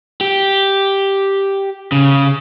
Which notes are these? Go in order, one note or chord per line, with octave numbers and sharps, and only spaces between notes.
G4
C#3